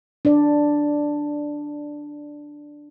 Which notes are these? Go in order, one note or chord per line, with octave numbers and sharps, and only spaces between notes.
D4 D5